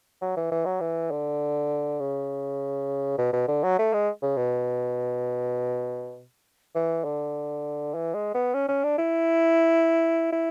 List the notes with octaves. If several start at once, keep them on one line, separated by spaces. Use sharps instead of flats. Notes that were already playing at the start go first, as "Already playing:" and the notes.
F#3
E3
E3
F#3
E3
D3
C#3
B2
B2
D3
F#3
A3
G#3
C#3
B2
E3
D3
E3
G#3
B3
C#4
C#4
D4
E4
E4